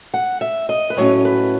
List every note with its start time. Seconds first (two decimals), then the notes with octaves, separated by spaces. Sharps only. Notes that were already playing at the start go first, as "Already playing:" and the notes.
0.14 F#5
0.41 E5
0.69 D#5
0.90 B4
0.97 A2 F#3 C#4 C#5
1.25 B4